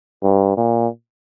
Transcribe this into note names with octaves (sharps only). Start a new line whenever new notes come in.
G2
A#2